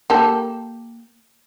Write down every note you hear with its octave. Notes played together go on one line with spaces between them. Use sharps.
A#3 G4 A4